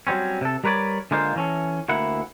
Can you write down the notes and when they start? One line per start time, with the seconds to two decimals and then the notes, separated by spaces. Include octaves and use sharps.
0.07 F#3 G3 C4 C#4
0.41 C3 A4
0.64 G3 A#4 B4 C#5 D5
1.11 D3 G#3 A#3 F4 C5
1.36 E3 C#4 A4
1.89 D2 A#3 E4 F#5